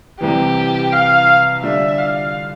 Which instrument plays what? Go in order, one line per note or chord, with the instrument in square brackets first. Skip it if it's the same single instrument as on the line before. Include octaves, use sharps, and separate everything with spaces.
[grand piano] C2 C3 E3 [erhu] G4
[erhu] F5
[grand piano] D3 G3 D4 F4 [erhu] E5
[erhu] F5